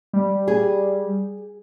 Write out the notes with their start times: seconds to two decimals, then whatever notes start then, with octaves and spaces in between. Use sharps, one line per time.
0.13 G3
0.48 G#4